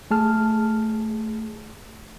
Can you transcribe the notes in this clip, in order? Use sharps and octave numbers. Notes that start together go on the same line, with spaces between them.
A3 G#4 A5 F6